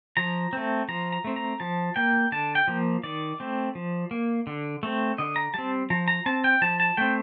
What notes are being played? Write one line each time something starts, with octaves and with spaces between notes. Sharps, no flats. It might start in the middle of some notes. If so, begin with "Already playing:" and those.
F3 A#5
A3 C4
F3 A#5
A#5
A3 C4
A#5
F3 A5
A#3 G5
D3 A5
G5
F3 A#3
D#3 D5
A3 C4
F3
A#3
D3
A3 C4
D3 D#5
A#5
G3 C4 A5
F3 A#5
A#5
C4 A5
G5
F3 A5
A5
A3 C4 G5